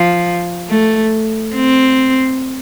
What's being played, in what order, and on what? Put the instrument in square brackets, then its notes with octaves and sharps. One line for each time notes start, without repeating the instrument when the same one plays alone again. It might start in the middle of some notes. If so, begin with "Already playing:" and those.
Already playing: [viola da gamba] F3
A3
C4